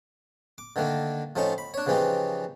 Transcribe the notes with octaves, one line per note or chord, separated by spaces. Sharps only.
D6
D3 D#3 A3 A#3
A2 F3 A3 C#4 D#4 C#6
B5
D4 C#5
C#3 E3 F3 C#4 D#4 G4